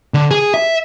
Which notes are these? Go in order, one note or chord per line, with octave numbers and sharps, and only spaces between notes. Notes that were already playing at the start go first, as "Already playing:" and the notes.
D3
G#4
E5